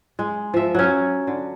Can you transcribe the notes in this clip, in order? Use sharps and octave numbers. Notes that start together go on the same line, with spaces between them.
G#3
F3 E5
F#3 C#4
D3